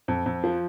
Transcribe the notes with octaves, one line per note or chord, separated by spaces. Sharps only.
F2
F2
F3